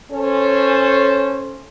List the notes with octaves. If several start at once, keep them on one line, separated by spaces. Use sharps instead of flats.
C#4 A4 C5 C#5